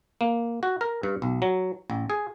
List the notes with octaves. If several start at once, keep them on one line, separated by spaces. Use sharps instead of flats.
A#3
F#4
A#4
G2
B1
F#3
A1
G#4